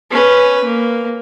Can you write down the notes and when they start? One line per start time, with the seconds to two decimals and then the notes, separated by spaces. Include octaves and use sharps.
0.11 C#4 B4
0.64 A#3